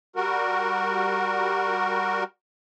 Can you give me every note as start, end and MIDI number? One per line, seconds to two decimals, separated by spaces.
0.16 2.24 55
0.16 2.24 66
0.16 2.24 70